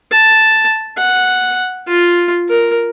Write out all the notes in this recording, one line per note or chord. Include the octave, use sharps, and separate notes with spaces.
A5
F#5
F4
A#4